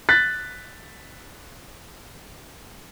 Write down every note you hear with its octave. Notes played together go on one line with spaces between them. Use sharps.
F#6 A6 B6